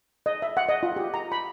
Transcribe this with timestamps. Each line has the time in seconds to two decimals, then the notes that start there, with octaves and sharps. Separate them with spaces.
0.26 D#5
0.42 E5
0.57 F#5
0.69 D#5
0.83 F4
0.96 G4
1.14 A#5
1.32 B5